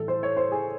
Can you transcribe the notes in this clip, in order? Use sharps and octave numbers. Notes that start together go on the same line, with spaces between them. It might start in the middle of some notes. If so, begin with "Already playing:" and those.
Already playing: A2 E3 A4
C5
C#5
C5
G#4